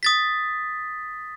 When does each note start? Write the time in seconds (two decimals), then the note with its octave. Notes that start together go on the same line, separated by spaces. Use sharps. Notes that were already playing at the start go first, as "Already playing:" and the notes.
0.03 D#6 A6 B6